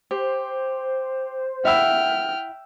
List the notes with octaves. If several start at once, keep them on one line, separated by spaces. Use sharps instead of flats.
G4 C5
E4 F#4 E5 F#5 G5 E6 F6